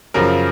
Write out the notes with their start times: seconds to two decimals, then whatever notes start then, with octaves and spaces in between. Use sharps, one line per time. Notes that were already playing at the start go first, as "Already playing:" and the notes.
0.14 F#2 C#3 F3 A#4